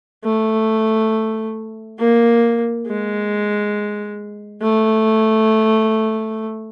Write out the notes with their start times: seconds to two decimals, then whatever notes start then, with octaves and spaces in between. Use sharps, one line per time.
0.24 A3
1.99 A#3
2.86 G#3
4.62 A3